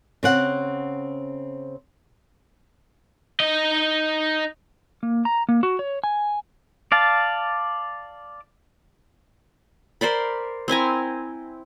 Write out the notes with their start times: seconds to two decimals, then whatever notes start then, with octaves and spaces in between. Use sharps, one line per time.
0.23 C#3 C4 F#5
3.40 D#4 D#5
5.03 A#3
5.25 A#5
5.49 A#3
5.63 F#4
5.79 C#5
6.04 G#5
6.92 D5 F5 A5
10.01 A#4 C5 D5 B5
10.68 C4 E4 G#5 A#5